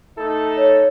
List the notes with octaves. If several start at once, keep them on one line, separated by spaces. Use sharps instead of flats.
A3 D#4 A4
C#5